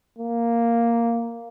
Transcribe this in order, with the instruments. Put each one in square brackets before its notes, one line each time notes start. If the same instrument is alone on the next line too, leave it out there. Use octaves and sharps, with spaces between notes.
[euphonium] A#3